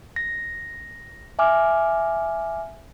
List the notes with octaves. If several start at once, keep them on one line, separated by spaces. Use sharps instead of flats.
A#6
E5 G#5 D6 F6